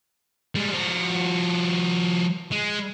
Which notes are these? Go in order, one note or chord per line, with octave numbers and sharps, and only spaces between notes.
G3 G#3
F3 F#4
G#3